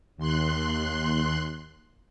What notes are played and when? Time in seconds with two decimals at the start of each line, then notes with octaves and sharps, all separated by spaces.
0.17 D#2 C6 F#6